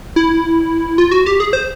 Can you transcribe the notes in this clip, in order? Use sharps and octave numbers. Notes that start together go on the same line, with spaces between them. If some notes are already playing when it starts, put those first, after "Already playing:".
E4
F4
F#4
G4
G#4
C5